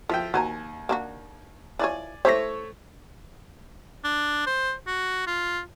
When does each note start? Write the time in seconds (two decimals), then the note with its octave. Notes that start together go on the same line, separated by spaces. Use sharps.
0.09 F3 A4 E5 G5
0.34 D#2 F#4 C5 G#5 A#5
0.89 A#3 D4 F#4
1.79 E3 F3 C#5 D5 G#5
2.25 A3 E4 G4 C5 C#5 E5 A#6
4.04 D4
4.47 C5
4.87 F#4
5.27 F4